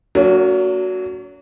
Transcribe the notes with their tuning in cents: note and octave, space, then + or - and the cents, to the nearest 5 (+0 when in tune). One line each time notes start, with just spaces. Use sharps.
F#3 +0 A#3 -35 C#4 +45